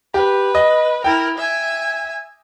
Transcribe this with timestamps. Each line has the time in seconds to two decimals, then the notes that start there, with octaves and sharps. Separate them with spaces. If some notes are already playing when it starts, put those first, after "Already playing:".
0.14 G4 B4
0.55 D#5
1.04 E4 A#4 G5
1.38 E5 G#5